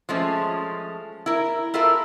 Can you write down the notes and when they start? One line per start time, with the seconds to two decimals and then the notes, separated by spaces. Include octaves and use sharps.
0.09 F3 G#3 A3 C#4
1.26 E4 A#4
1.74 E4 F4 A4 A#4 E5